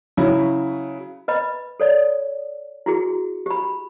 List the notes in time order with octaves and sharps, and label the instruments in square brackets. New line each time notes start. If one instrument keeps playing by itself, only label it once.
[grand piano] C#3 F#3 E4
[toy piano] B4 D#5 B5
A4 C#5 D5
E4 F#4 G#4
G4 B5